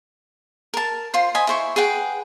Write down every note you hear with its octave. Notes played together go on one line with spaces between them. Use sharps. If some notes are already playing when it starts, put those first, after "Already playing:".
A#4 A5
F4 C5 C6
C5 D#5 G#5 B5
E4 C5 C#6
G#4 B4 F#5 G5